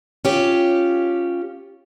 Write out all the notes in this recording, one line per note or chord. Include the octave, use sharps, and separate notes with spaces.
C#4 F4 G4